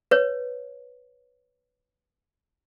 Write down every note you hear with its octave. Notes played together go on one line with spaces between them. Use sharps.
B4 C#5